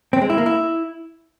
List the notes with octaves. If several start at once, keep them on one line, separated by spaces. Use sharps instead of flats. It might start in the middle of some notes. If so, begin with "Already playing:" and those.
C4
G#3
E4
A#3
E4